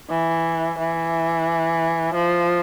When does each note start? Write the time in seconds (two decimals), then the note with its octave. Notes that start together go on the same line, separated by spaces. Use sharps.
0.10 E3
0.79 E3
2.15 F3